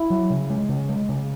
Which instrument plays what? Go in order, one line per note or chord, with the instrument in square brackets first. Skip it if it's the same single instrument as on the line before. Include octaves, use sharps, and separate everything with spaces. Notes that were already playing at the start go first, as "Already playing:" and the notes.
Already playing: [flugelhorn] E4
[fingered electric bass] F#3
C#3
G#3
C#3
G#3
C#3